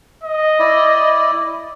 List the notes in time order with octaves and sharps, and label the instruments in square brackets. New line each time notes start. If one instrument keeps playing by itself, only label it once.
[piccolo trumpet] D#5
[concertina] E4 D5